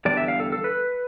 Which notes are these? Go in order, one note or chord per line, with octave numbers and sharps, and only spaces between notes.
E2 D3 G3 D5
E5
F5
A4
A4
B4